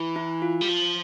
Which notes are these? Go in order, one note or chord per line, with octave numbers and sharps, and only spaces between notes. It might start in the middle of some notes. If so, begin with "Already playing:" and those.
Already playing: E3
E4
F4
G3
F3